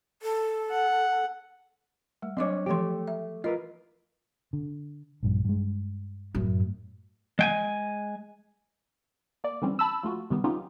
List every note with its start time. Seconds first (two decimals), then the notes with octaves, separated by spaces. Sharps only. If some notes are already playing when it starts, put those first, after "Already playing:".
0.22 A4
0.70 F#5
2.22 G3 A3
2.37 F#3 C4 D4 C#5 D#5 D6
2.66 E3 F3 A3 G4 C6
3.08 E5
3.44 F4 A#4 B4 D#5
4.53 D3
5.23 A#1 G2
5.45 G2 G#3
6.35 F#2 A2
7.39 G#3 G5 G#5
9.44 A#3 D5
9.62 D3 E3 G3 C4 C#4
9.79 A5 B5 E6
10.03 F3 A3 F4 F#4
10.30 C3 D#3 G3 B3
10.44 F#3 B3 C#4 D#4 F4 G4